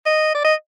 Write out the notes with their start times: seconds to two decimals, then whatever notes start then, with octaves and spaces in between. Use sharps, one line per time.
0.06 D#5
0.35 D5
0.44 D#5